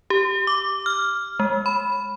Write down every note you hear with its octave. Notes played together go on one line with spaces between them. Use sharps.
G4
D6
F6
G#3
B5